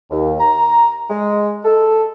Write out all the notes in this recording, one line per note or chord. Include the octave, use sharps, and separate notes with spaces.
D#2
A#5
G#3
A4